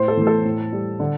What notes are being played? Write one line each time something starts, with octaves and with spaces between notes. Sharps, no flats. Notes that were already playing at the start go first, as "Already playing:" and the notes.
Already playing: A2 C5
A4
E3 A3
A4
A2
G3
D3